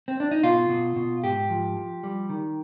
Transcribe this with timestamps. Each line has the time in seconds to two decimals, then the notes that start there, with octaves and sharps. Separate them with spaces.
0.08 C4
0.20 D4
0.31 D#4
0.43 B2 F4
0.69 B2
0.96 B2
1.23 G#2 G4
1.50 F3
1.77 F3
2.03 G3
2.30 D#3